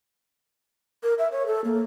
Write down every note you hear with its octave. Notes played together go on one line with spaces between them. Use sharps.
A#4
E5
C#5
A4
A#3